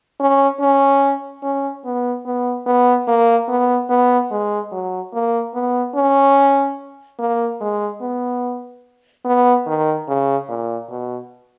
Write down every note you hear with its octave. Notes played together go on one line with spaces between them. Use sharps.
C#4
C#4
C#4
B3
B3
B3
A#3
B3
B3
G#3
F#3
A#3
B3
C#4
A#3
G#3
B3
B3
D#3
C#3
A#2
B2